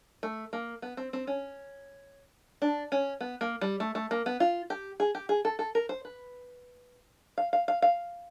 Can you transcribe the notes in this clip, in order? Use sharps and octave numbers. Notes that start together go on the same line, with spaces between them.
A3
A#3
B3
C4
C4
C#4
D4
C#4
B3
A#3
G3
A3
A3
A#3
B3
F4
G4
G#4
G4
G#4
A4
A4
A#4
C5
B4
F5
F5
F5
F5